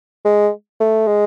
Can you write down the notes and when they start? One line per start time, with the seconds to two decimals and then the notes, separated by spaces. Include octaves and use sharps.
0.25 G#3
0.80 A3
1.07 G#3